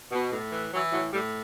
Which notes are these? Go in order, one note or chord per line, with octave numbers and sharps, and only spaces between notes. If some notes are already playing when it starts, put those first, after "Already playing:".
B2
A2
E3
E3 F#3
A2 F#3
A2 G3